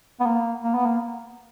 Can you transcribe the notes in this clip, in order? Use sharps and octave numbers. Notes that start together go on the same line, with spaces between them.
B3
A#3
A#3
B3
A#3